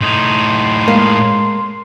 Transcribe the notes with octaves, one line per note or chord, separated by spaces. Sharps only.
A2 D#4 C6
G#3 A#3